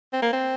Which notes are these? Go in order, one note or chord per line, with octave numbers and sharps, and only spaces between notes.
C4
A#3
C4